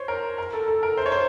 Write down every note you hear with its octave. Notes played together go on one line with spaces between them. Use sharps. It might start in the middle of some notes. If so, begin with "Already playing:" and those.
Already playing: C5 C#5
A#4
A#4
A4
A4
A#4
C5
C#5
C5